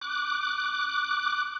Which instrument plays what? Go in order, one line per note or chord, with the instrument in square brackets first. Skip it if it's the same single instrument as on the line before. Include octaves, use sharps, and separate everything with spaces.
[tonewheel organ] D6 F#6